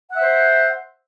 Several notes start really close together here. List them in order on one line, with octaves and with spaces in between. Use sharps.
F#5 E5 C5